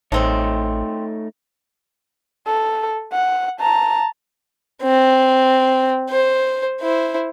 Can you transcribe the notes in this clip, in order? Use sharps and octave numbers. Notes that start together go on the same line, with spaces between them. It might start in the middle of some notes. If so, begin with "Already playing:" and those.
A1 G#3 A3 C4 D#4 C#5 A5
A4
F#5
A5 A#5
C4
C5
E4 C5